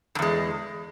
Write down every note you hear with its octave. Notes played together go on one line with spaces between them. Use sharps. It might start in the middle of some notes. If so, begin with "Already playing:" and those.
E2 G2 G#3